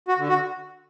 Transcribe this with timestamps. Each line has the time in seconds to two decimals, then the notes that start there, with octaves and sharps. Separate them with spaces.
0.08 F#4
0.18 D3
0.28 F#4